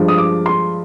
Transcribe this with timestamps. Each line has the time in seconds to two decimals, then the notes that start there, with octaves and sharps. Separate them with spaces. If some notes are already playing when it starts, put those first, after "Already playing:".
Already playing: G2 F3 G#3
0.08 D#6
0.18 D6
0.46 C6